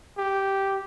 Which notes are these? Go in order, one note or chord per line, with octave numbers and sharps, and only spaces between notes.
G4